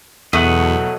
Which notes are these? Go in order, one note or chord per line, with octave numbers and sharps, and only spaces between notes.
E2 B2 F#3 A3 D#5 F#5